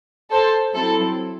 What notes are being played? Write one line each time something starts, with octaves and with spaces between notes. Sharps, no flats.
A4 C5
F#3 C4 E4 A4